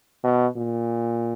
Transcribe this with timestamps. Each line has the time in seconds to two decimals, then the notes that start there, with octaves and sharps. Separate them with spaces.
0.24 B2
0.57 A#2